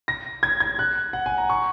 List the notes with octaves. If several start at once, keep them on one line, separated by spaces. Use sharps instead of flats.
A#6
G#6
G#6
F#6
F#5
G#5
A#5
C#6